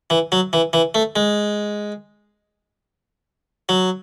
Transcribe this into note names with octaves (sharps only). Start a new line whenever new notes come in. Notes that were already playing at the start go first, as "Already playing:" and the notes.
E3
F#3
E3
E3
A3
G#3
F#3